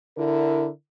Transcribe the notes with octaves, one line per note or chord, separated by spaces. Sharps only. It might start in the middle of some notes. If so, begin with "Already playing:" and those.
D3 E4 A#4